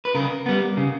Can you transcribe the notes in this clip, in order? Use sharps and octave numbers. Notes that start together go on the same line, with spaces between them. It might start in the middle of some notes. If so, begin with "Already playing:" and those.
B4
C#3 A#4
G3 B3
C#3